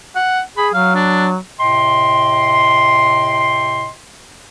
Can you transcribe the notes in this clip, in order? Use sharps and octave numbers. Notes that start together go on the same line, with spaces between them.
F#5
G#4 B5
F#3 F5
D4
A2 C3 D#5 G5 C6